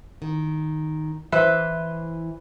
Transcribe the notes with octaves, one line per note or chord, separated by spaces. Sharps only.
D#3
E3 B4 C5 E5